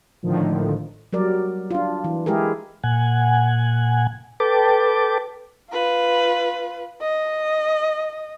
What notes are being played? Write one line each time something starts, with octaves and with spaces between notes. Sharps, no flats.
G#1 A2 D3 D#3 F3
F#3 G3 A#4 D5
D4 F4
E3
G#3 E4 G4 G#4 A#4
A#2 F#5 G#5
A4 B4 G5 A5 D6
F4 B4
D#5